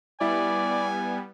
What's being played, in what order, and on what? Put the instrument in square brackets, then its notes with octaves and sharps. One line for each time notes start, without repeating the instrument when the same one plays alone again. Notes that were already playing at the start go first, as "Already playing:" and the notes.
[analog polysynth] G3 B3 [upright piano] E4 [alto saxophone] D5 [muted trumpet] G#5